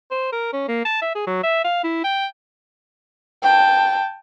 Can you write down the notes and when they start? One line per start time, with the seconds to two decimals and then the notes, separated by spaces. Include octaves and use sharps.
0.11 C5
0.32 A#4
0.53 C#4
0.68 A#3
0.85 A5
1.01 E5
1.15 G#4
1.27 F#3
1.43 E5
1.64 F5
1.83 E4
2.04 G5
3.43 G5 A5